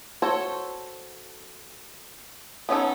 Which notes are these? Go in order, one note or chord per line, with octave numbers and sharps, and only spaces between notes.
F#4 A4 C5 C#5
B3 C#4 D#4 A4